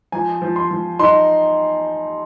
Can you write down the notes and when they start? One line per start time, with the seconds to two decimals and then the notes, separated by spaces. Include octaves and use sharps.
0.12 F3 G#5
0.42 F3
0.56 C6
0.71 F3
1.00 D#4 C6